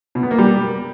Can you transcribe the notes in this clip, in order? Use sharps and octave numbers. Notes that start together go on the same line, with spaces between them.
B2
B3
A#3
G3